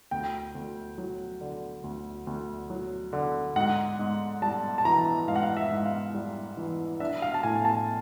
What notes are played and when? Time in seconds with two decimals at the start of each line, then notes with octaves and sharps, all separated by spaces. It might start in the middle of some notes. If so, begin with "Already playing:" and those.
0.11 D2 G5
0.55 D2
0.98 F#3
1.41 D3
1.84 D2
2.27 D2
2.70 F#3
3.13 D3
3.56 G#2 F#5
3.99 G#2
4.42 G3 A5
4.78 A5
4.85 E3 A#5
5.28 G#2 F5
5.36 F#5
5.43 F5
5.57 E5
5.71 G#2
5.86 F5
6.14 G3
6.57 E3
7.00 D4 E5
7.22 F5
7.34 A5
7.43 A2 G#5
7.65 A5